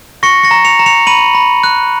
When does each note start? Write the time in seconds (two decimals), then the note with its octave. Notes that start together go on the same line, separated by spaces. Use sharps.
0.23 C#6 A#6 C#7
0.43 A#6 C#7
0.51 A#5
0.64 C#7 F7
0.79 A#5
0.86 C#7 F7
1.07 B5 D#7 F#7
1.35 B5
1.63 F#6